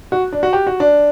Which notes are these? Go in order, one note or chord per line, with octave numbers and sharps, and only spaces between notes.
F#4
D4
F#4
G4
F#4
D4